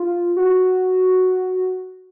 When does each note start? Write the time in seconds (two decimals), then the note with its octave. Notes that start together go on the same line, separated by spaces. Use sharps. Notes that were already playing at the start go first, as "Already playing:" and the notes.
Already playing: F4
0.37 F#4